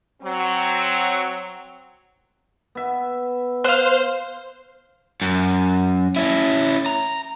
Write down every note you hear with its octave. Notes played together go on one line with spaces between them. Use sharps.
F#3 C4
B3 E5
C5 F5 F#6
F#2
C#4 E4
A#5